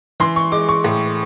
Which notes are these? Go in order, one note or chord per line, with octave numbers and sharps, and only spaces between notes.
E3 C6
C#6
G#3 D6
C#6
A2